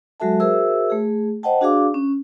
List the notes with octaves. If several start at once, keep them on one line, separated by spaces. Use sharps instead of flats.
F#3 G#3 F#4 A4 E5 A5
F#4 G#4 A#4 C5 E5 E6
A3 G#4
C5 D#5 F#5 G5 A5
D4 F#4 G#4 D5 F5 D6
C#4